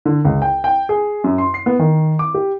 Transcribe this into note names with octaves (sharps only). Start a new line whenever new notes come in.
D3
C#2
G5
G5
G#4
F#2
C6
C7
B3
D#3
D6
G4